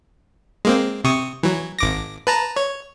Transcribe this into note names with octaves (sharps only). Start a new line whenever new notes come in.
G#3 A#3 C4
C3 C#6 D#6
E3 F#3
G#1 D6 A#6
B4 A5 A#5
C#5